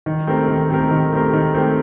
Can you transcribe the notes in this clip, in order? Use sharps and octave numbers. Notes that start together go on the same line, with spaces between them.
D#3
A3 C4 G4 A#4
D#3
A3 C4 G4 A#4
D#3
A3 C4 G4 A#4
D#3
A3 C4 G4 A#4